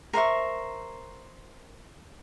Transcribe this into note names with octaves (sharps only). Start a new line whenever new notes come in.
A#4 C5 E5 C#6